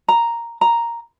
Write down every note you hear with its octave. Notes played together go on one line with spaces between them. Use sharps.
A#5
A#5